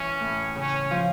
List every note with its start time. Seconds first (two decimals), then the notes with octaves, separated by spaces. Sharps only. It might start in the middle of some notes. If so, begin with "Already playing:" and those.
Already playing: E3 C#4
0.20 A2
0.55 C#3 C#4
0.91 F3